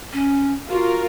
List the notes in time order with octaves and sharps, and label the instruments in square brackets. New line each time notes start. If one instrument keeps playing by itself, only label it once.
[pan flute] C#4
[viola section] F4 A#4 [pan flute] F#4